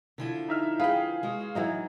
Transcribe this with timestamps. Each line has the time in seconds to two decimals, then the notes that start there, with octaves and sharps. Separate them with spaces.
0.18 D3 F3 E4
0.49 D#4 E5 F6
0.80 G#4 B4 F5 G5
1.23 G#3 F#4
1.55 E3 F#3 D#4